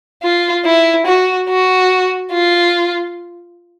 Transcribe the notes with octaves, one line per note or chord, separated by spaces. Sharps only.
F4
E4
F#4
F#4
F4